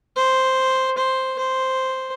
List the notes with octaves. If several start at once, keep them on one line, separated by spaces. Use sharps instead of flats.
C5
C5
C5